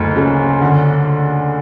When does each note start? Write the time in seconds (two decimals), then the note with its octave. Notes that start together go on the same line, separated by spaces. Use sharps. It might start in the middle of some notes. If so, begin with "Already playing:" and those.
Already playing: F#1 D2
0.16 C#3
0.61 D3